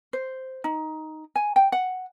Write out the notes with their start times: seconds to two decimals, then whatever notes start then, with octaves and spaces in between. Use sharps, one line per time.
0.13 C5
0.64 D#4
1.36 G#5
1.56 G5
1.72 F#5